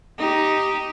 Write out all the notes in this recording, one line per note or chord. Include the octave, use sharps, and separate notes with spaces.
D#4 G4